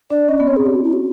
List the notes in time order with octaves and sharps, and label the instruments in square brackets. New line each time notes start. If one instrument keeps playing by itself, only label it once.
[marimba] D4 [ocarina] D5
[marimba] C#4 [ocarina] D#5
[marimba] B3 [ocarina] D5
[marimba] C4 [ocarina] C#5
[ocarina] G#4
G4
F#4
E4
F#4